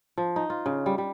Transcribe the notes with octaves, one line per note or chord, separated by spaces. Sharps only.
F3
D#4
F4
C#3
G3
G3